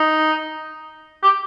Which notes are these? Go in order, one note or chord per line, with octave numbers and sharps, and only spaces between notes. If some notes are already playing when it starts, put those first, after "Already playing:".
Already playing: D#4
G4